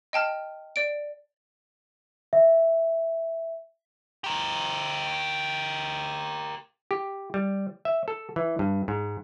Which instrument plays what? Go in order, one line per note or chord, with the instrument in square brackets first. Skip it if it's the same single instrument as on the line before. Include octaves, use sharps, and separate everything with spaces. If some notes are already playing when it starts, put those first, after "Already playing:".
[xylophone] D#5 G5 A5 F6
D5 D7
[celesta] E5
[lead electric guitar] G4 A#4
[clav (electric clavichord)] G4
G3
E5
A4
E3
G2
G#2